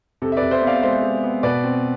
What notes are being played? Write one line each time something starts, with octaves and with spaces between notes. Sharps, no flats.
C3 A4
E5
B4 D5
C3
C5 E5
B3
D5 F5
G#3 C5 E5
G#3
B3
B2 B4 D5
C4